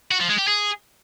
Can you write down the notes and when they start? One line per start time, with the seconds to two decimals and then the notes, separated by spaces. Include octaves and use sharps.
0.11 F#4
0.20 F3
0.29 G#3
0.39 G4
0.48 G#4